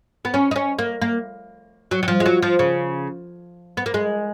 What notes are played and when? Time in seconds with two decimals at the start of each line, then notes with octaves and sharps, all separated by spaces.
0.25 B3
0.34 C#4
0.51 D#4
0.56 C#4
0.79 A#3
1.02 A#3
1.91 F#3
2.03 F#3
2.08 F3
2.20 G#3
2.26 F#3
2.42 F3
2.59 C#3
3.77 B3
3.86 A#3
3.94 G#3